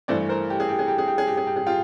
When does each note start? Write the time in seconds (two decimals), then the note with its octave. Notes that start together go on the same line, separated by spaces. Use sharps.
0.08 G2 E3 A3 C5 D5
0.29 A#4 C5
0.50 G4
0.60 G#4
0.69 G4
0.79 G#4
0.88 G4
0.98 G#4
1.08 G4
1.18 G#4
1.27 G4
1.37 G#4
1.47 G4
1.56 G#4
1.66 F4 G4